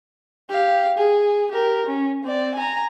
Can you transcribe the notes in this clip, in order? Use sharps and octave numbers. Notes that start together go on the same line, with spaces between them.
G4 F5
G#4
G4 A#4
C#4
C4 D5
G#5 A#5